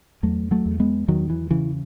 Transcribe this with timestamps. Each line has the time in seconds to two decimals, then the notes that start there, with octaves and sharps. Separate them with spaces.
0.23 E2 F#3 A3
0.51 F#3 A3
0.66 E2
0.80 G#3 B3
1.08 E2 D#3 F#3
1.30 E3
1.51 C#3 E3